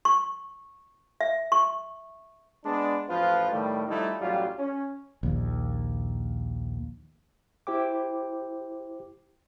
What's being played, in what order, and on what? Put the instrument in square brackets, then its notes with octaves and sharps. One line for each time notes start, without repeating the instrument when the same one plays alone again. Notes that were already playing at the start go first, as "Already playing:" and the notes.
[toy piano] C#6
E5
C#6
[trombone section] G#3 B3 D4
A1 F3 F4 B4
A2 D#3 G3 A3
F3 G3 A3 D#4 E4
A1 F#3 G3 F4 G4
C#4
[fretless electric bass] A#1 D#2
[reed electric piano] E4 G4 C5 G5 D6